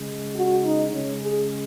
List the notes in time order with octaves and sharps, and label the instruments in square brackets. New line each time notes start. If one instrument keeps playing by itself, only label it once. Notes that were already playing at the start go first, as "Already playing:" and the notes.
Already playing: [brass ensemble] C#3 G#3
F#4
D#4
C#3 G#3 C#4
G#4